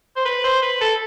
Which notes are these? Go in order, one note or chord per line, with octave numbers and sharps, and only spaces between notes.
C5
B4
C5
B4
A4